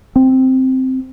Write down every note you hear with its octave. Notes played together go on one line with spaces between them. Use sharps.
C4